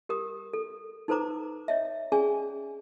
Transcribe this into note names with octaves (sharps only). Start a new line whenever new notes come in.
G4 A#4 D#6
A4
D#4 A4 B4 C5 A#5 D6
C#5 D#5 E5
C#4 G#4 D5 G#5